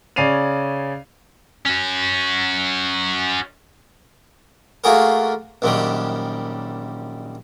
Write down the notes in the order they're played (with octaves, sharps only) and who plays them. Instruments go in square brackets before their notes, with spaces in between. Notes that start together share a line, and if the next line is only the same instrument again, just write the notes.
[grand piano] C#3 C#4 D5 C7 D#7 F7
[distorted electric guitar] C#4 F#4
[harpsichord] A3 A#3 F4 F#4 G#4 A#4
A#1 F#2 D#3 G3